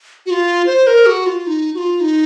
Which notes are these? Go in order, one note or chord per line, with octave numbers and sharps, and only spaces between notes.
F#4
F4
C5
A#4
F#4
F4
D#4
F#4
F4
D#4